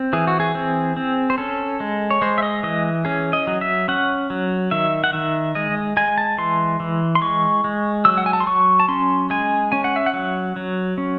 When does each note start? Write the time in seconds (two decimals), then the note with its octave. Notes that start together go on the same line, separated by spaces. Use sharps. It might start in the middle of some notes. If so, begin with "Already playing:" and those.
Already playing: C4
0.13 E3 G#4
0.27 F#4
0.40 G#4
0.55 C4
0.97 C4
1.30 C5
1.38 C#4 A4
1.80 G#3
2.10 C#5
2.21 G#3 C5
2.38 E5
2.43 D#5
2.63 E3 D#5
3.05 C#4 G#4
3.33 D#5
3.47 F#3
3.61 E5
3.88 C#4 F#5
4.30 F#3
4.71 D#3 E5
5.04 F#5
5.13 D#3 E5
5.55 G#3 D#5
5.97 G#3 G#5
6.18 A5
6.38 E3 C6
6.80 E3
7.15 C6
7.22 G#3 C#6
7.64 G#3
8.05 F#3 E6
8.18 F#5
8.26 G#5
8.33 A5
8.40 C6
8.47 F#3 C#6
8.80 A5
8.88 C#4 C6
9.30 G#3 G#5
9.72 C#4 G#5
9.84 F#5
9.96 E5
10.06 F#5
10.14 F#3
10.56 F#3
10.98 C#4